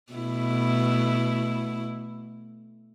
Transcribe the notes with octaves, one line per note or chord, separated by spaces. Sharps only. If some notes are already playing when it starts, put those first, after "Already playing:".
B2 A3 E4